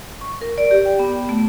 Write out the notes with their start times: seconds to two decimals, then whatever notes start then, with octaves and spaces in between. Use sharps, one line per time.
0.21 C#6
0.41 A#4
0.58 D5
0.71 G4
0.85 G5
0.99 B3
1.29 A3